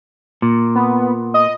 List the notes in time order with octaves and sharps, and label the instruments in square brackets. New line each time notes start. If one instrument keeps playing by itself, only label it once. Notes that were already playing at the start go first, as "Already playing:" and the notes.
[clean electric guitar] A#2
[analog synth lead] B3
D#5